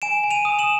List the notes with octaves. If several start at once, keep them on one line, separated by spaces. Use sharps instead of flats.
G#5 D7 E7
G#5
D#7 F7
D#6
E7 F#7